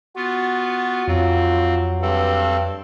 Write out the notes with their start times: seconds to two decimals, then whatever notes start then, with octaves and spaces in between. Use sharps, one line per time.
0.16 B3 F4 F#4
1.08 F2 F#3 C4 F4
2.02 G2 C4 A4